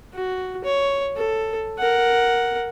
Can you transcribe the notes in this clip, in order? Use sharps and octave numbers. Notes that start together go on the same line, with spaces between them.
F#4
C#5
A4
A#4 F#5